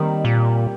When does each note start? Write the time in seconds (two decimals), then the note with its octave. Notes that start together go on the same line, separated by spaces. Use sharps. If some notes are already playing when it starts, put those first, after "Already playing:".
Already playing: D#3 G3 A#3 C4
0.25 A#2